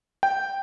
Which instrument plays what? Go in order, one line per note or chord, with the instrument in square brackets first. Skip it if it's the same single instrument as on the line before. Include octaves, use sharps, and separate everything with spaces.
[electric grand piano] G5